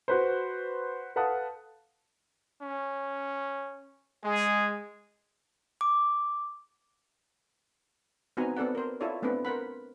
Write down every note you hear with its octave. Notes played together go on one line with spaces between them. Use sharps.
F#4 B4 C5
A4 B4 F5 F#5 A5 D#6
C#4
G#3 G#4
D6
B3 C4 D#4 F#4 G#5 A#5
B3 C4 A4 D5 F#5
A#4 C5
E4 F4 A4 C#5 D5
A3 B3 C4 D4 B4
A#4 C5 F#5 B5